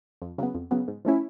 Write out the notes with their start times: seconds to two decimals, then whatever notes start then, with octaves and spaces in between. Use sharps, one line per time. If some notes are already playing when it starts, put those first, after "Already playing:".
0.22 F2
0.38 C#3 F#3 B3
0.54 F2
0.71 C#3 F#3 B3
0.88 G#2
1.05 F3 A3 C#4 E4